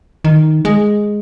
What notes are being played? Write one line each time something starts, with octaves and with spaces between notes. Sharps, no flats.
D#3
G#3